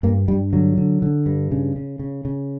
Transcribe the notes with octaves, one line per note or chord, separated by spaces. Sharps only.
G2 A#3
G2 G3
D3 F#3
D3
D3
G2
C#3
C#3
C#3
C#3